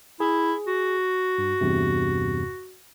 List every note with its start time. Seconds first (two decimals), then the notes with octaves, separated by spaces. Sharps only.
0.20 E4 G#4
0.67 F#4
1.38 G2
1.61 E2 G2 C3